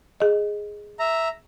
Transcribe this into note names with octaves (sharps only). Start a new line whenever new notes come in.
G#4 D#5
E5 A#5